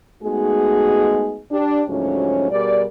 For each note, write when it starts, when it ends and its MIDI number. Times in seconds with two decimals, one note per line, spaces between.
0.23 1.39 56
0.23 1.39 57
0.23 1.39 59
0.23 1.39 63
0.23 1.39 66
0.23 1.39 68
1.50 1.80 62
1.50 1.80 67
1.87 2.49 38
1.87 2.49 44
1.87 2.49 53
1.87 2.49 54
1.87 2.49 61
2.50 2.83 47
2.50 2.83 55
2.50 2.83 68
2.50 2.83 70
2.50 2.83 74